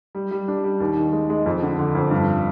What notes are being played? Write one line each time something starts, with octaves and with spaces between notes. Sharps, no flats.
G3
G3
D4
G3
D#2
D#3
G#3
G#3
F2
D3
D3
F2
G2